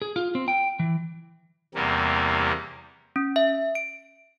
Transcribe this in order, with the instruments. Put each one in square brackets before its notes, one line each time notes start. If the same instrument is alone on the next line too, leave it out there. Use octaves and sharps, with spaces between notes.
[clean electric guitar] G#4
F4
C4
G5
E3
[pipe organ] E2 C3 G3 A#3
[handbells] C#4
E5
D7